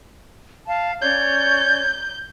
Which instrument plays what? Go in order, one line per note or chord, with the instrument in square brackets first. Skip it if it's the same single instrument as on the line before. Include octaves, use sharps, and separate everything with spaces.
[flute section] F5 A5
[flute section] C#4 C#5 D5 [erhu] G6